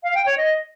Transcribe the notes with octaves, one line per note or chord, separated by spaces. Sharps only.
F5
G5
C#5
D#5